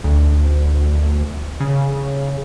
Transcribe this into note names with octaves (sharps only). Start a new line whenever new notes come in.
D2
C#3